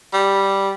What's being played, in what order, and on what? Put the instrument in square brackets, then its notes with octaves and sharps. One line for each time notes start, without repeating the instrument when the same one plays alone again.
[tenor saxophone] G3